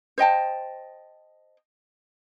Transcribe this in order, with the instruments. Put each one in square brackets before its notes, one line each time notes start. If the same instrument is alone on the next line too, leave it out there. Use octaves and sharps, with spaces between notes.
[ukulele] C5 D#5 G5 A5